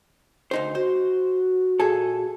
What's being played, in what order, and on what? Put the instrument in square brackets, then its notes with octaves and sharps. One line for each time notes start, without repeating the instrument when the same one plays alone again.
[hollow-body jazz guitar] D2 D#4 C5
[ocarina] F#4 [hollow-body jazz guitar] C5
[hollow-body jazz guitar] A#2 G#4 A4